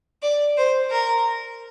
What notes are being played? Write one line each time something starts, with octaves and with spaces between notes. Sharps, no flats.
D5
C5
A#4